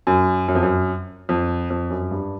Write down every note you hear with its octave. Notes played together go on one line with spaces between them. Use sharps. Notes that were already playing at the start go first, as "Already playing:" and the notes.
F#2
F#2
F2
F#2
F2
F2
F#2
G2